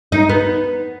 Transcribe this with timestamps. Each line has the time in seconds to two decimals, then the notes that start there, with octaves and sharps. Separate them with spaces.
0.12 D#4
0.29 B3